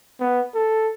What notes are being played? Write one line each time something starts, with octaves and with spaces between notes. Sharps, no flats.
B3
A4